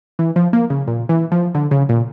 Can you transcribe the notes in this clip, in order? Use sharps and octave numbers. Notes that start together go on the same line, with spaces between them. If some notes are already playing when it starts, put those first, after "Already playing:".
E3
F3
A#3
C#3
A#2
E3
F3
D3
C#3
A#2